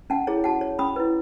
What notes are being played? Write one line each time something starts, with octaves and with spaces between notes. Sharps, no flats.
C#4 F#5 A5
E4 G#4 C#5
F#4 F#5 A5
C#5
C#4 B5 D#6
E4 B4